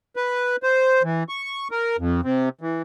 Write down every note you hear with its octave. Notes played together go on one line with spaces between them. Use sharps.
B4
C5
E3
C#6
A#4
F2
C3
E3